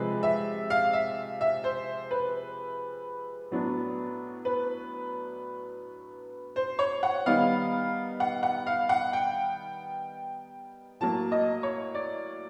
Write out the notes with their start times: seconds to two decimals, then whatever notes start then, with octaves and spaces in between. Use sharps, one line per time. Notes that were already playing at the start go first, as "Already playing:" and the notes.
Already playing: C3 F3 G#3 B4
0.23 E5
0.70 F5
0.93 E5
1.41 E5
1.64 C5
2.11 B4
3.51 A2 F#3 B3 D4
4.45 B4
6.56 C5
6.79 C#5
7.03 F#5
7.26 D#3 G3 B3 D#4 F5
8.20 F#5
8.43 F#5
8.66 F5
8.89 F#5
9.13 G5
11.00 A2 F#3 A#3 A5
11.32 D#5
11.63 C#5
11.95 D5